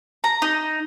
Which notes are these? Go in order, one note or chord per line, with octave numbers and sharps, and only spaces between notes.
A#5
D#4